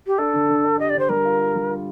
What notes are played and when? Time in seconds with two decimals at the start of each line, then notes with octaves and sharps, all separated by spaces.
0.07 G4
0.18 D4 A4
0.33 D3
0.49 D3
0.64 D4
0.79 G4 D#5
0.90 D5
0.95 D3 C5
1.09 G3 A#4
1.25 F4
1.40 F4
1.55 G3
1.70 F4